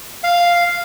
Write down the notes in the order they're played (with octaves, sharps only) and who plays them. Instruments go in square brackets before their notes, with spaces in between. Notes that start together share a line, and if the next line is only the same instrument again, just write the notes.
[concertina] F5